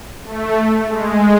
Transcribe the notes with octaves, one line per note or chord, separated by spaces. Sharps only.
A3
G#3